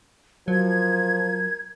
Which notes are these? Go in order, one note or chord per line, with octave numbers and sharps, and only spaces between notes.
F3 F#3 A#4 G#6